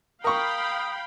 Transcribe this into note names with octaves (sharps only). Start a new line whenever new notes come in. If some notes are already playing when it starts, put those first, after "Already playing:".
A#4 F5 G5 B5 C#6 D#6